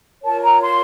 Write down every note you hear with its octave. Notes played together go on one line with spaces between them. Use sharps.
F4 A#4 C#5 A5
A#5
C6